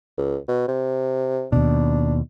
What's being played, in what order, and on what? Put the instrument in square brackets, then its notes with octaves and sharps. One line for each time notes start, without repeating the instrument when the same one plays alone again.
[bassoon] C#2
B2
C3
[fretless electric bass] D#2 B2 [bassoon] D4